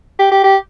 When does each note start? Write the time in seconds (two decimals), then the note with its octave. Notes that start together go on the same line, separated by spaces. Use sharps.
0.19 G4
0.31 G4
0.44 G4